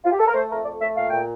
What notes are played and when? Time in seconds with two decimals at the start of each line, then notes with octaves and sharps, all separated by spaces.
0.05 F4
0.12 G4
0.19 A4
0.27 A#4
0.34 A3 C5
0.50 F2 A#4
0.65 A3 D5
0.81 A3 E5
0.97 A#2 F5
1.10 A#2 G5